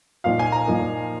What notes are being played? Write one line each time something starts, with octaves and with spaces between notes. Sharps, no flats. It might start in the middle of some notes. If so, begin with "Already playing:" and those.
A#2 F3 A#3 D#4 F5
G#5
A#5
A#2 F3 A#3 D#4